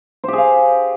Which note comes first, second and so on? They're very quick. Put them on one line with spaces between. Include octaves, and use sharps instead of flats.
C5 G4 G#4 F5